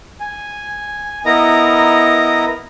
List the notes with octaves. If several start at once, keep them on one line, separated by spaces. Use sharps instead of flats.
G#5
B3 E4 A#4 D#5 A#5